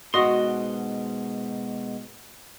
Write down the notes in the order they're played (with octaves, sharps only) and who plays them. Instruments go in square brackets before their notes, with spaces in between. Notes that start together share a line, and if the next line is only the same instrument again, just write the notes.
[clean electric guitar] G#2 B2 C6 [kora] F#4 D#5